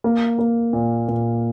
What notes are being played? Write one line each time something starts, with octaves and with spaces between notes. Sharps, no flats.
A#3
A#3
A#2
A#2